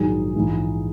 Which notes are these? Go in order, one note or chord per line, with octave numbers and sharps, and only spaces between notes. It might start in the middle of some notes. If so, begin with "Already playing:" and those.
Already playing: A#1 G#2 D#3 F#3 G#4
A#1 G#2 E3